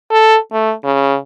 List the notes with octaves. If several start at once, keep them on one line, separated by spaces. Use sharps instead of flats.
A4
A3
C#3